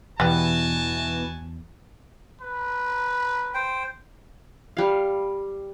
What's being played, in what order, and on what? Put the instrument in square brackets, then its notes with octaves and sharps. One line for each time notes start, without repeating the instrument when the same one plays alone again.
[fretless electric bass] E2 [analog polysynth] B2 E3 [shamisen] G3 B3 [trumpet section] F#4 G#5 A5
[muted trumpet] B4
[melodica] C5 G5
[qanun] G3 F5